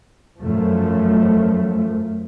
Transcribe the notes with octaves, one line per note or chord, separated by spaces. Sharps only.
F#2 F3 A3